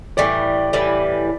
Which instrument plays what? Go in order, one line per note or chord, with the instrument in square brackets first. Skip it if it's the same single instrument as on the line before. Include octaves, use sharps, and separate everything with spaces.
[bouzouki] A2 E3 G3 [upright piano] D5
[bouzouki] A2 E3 G3